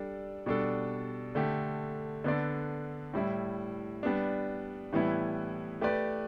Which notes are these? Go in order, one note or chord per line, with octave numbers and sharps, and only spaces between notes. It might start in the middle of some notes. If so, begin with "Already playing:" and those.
Already playing: G3 D4 A4 D5
B2 G3 D4 A4
D3 A3 G4
D3 B3 D4 A4 D5
A2 G3 E4
G3 B3 D4
A2 E3 G3 B3 E4
A3 G4 B4 D5